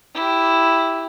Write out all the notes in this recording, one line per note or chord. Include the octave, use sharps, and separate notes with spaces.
E4 G4